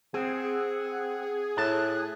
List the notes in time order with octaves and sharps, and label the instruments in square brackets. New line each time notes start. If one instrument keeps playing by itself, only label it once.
[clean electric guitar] C4 [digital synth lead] G#4 [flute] F#5
[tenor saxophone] A2 [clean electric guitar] A5 [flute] F#6